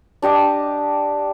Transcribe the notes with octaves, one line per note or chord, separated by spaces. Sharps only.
D4 G4 D#5 A5